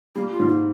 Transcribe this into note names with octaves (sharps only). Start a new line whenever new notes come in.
G3 A#3
F4
G#2
A#3